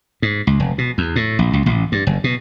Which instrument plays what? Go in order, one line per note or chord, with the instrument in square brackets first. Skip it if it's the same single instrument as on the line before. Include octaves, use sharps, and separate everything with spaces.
[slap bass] G#2
C#2
F1
B2
E2
A2
A#1
C#2
A1
G2
F#1
B2